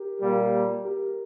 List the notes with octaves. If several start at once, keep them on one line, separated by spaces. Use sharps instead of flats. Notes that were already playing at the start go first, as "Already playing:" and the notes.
Already playing: G4 A#4
A#2 G3 A#3
G4 A#4